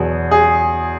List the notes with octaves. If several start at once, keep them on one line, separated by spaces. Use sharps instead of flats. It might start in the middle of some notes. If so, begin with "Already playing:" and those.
Already playing: E2 B2 F#3 B3 G#4
G#4